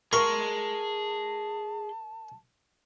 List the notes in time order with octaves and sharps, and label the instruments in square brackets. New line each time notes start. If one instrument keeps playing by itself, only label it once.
[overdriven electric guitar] G#4 C6 [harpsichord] A#4 [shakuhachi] A5 [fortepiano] C#6